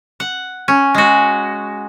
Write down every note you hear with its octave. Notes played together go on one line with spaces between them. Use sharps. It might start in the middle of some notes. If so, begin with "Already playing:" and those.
F#5
C#4
G#3 F#4